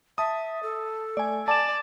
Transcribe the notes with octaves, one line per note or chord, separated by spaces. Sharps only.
E5 A5 D#6
A4
A3 D5 G#5
D5 G#5 A5 E7